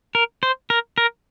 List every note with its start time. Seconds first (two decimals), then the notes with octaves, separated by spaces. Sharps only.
0.15 A#4
0.43 C5
0.70 A#4
0.98 A#4